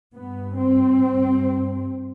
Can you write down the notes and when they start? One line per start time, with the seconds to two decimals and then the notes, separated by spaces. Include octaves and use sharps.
0.13 G2 B3
0.58 C4
1.01 G2